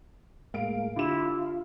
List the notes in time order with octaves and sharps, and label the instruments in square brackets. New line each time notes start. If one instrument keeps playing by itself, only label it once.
[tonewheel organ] A2 G#3 A#3 [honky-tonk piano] F5 D7
[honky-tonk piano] D3 G4 E7 [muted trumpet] E4 [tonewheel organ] F4